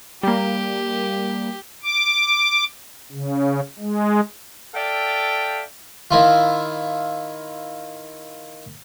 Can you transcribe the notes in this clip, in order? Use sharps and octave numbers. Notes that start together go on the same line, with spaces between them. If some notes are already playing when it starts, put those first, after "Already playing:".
G3 A#3 G4
D6
C#3
G#3
A4 D5 E5 F5 G5
D#3 E4 F4